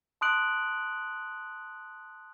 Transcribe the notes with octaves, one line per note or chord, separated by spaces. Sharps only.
A5 C6 D#6 F#6 D7 F#7